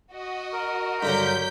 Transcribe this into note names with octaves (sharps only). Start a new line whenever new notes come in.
F#4 D#5
A#4
G2 D3 F#3 G6 B6